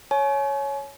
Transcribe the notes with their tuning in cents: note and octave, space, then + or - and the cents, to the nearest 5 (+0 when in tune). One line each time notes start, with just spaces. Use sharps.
C#5 +0 G#5 +40